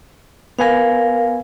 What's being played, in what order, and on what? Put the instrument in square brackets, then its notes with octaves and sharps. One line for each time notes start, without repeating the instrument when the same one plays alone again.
[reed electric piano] B3 B4 G#5 [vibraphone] A#4 F5